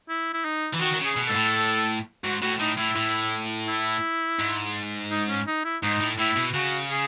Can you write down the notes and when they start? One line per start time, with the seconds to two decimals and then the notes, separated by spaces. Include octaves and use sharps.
0.09 E4
0.33 E4
0.45 D#4
0.73 E3
0.80 D#3 F#4
0.93 D#3
0.98 C#3
1.05 G#4
1.16 B2
1.28 G#2 A4
1.35 A2
2.24 G#2 F#4
2.42 A2 F#4
2.59 A2 D#4
2.77 A2 E4
2.96 A2
3.67 E4
4.39 G#2
5.11 D#4
5.29 C#4
5.47 D#4
5.65 E4
5.83 G#2 D#4
6.01 A2
6.18 A2 E4
6.37 B2
6.54 C#3 F#4
6.90 G#4